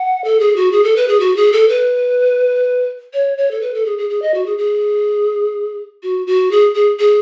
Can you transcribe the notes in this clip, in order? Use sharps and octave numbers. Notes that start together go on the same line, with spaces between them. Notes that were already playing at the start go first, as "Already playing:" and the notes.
Already playing: F#5
A4
G#4
F#4
G#4
A4
B4
G#4
F#4
G#4
A4
B4
C#5
C#5
A4
B4
A4
G#4
G#4
G#4
D#5
F#4
G#4
G#4
F#4
F#4
G#4
G#4
G#4